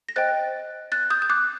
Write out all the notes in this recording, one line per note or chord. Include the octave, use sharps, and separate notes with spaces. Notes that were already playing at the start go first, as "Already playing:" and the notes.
A#6
C5 D#5 G5 F#6 A6
F#6 A6
D#6 G6
G6
D6 F#6